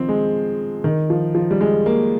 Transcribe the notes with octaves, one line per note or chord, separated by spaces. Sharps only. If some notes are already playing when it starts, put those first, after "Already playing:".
Already playing: D#3 F3 C4
G#3
D#3
F3
F3
G3
G#3
A#3